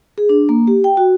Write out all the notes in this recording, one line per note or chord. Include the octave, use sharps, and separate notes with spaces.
G#4
D4
A#3
G4
G5
F#4